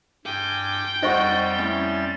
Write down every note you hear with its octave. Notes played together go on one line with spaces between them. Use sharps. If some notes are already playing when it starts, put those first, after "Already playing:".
G2 G5 G#5 D6
F2 G3 D#4 C5 D#5 F#5 C#6 A6
C#4 E4